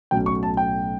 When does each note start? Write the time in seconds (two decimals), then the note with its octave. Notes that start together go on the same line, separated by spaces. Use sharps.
0.11 B1 A2 F#3 C#4 G5
0.26 C#6
0.43 A5
0.57 G5